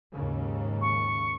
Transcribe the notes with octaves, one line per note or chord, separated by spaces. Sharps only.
D#2 G#2 C#3
C#6